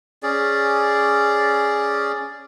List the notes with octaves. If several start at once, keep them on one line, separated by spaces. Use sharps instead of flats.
C#4 G#4 D5